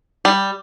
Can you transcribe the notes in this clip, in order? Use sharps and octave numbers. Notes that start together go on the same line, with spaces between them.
G3